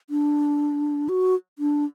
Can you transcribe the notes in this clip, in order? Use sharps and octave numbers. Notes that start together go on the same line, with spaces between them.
D4
F#4
D4